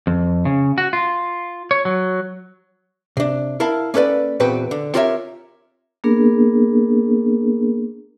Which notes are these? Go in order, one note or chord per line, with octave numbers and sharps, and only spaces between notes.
F2
C#3
F#4
F4
C#5
F#3
C3 D4
E4 A#4 F5 A5
A#3 C#4 A4 B4 D5
E2 A#2 C4 F#4 B4 G5
D3
C4 F4 G4 A#4 C#5 E5
A#3 B3 D4 G#4 A#4